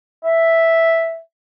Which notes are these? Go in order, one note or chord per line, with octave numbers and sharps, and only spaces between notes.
E5